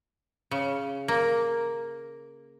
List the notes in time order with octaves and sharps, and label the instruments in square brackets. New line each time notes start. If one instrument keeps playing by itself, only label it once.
[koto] C#3
A#3